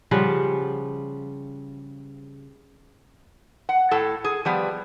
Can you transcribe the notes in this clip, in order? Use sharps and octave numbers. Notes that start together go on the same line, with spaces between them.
C#3 F3 G3 F#5
F#5
A2 A4
G#4
F3 G3 B3